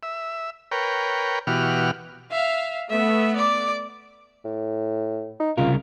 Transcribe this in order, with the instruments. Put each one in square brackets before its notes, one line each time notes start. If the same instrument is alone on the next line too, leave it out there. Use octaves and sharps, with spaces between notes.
[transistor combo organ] E5
A#4 B4 C#5 G5
B2 E3 F#4 G4 F6
[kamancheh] E5 [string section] F5
[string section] A3 B3 [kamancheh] E5
[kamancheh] D5 D6
[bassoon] A2
D#4
[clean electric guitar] C2 C#3 A#4 [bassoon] F4